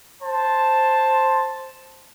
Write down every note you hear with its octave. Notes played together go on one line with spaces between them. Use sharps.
C5 A5